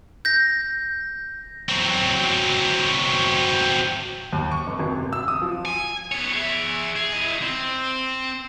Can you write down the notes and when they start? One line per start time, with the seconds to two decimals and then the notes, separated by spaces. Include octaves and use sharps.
0.25 G6 A#6
1.69 F#3 C4
4.33 D#2
4.51 C#6
4.67 F1
4.80 G#1
4.97 C3
5.13 E6
5.28 D#6
5.42 F3
5.65 G#5
6.12 B3 C#5
6.33 G#4 E5
6.96 G#4
7.13 E4 D#5
7.42 C4